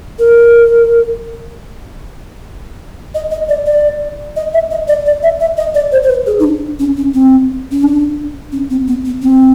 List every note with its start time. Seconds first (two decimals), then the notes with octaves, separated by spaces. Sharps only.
0.19 A#4
3.15 D#5
3.31 D#5
3.49 D5
3.66 D5
4.36 D#5
4.53 E5
4.71 D#5
4.88 D5
5.06 D5
5.23 E5
5.40 E5
5.57 D#5
5.75 D5
5.92 C5
6.03 C5
6.09 B4
6.27 G#4
6.39 D#4
6.44 D4
6.79 C#4
6.97 C#4
7.14 C4
7.72 C#4
7.83 D4
8.52 C#4
8.70 C4
8.88 B3
9.05 B3
9.22 C4